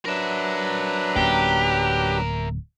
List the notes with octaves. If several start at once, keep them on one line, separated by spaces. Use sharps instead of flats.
F#3 D4 A#4 B4 E5
D1 A#3 C#4 G4